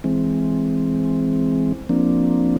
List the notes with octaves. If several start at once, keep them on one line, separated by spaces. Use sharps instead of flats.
E3 G#3 C4
F3 A#3 C4 D4